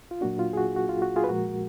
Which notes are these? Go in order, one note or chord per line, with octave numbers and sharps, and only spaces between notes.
F4
A#2 F#3 A#3 D4 F#4
F4
G#4
F#4
F#4
F4
F#4
F4 G#4
B4
A#2 F3 G#3 F#4 A#4